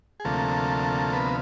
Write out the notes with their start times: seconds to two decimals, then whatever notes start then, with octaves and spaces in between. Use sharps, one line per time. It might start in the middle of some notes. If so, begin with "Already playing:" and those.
0.20 G#4
0.25 D2 C3 F3 A3 A#3 A4
1.13 B3 B4